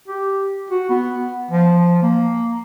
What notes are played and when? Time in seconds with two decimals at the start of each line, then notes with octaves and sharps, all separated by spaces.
0.08 G4
0.70 F#4
0.89 B3
1.51 F3
2.02 A#3